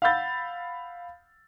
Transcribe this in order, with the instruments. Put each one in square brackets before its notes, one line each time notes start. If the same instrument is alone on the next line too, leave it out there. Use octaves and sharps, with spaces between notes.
[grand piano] F5 F#5 B5 E6 G6 A6